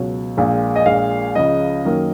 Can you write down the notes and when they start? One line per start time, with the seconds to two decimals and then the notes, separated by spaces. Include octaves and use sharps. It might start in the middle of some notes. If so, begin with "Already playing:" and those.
Already playing: C#2 B2 F#3
0.37 A#1 A#2 F3 G#3
0.76 D#5
0.86 A#1 A#2 G#3 F5
1.35 C#2 C#3 F3 D#5
1.84 F#2 D#3 F#3 A#3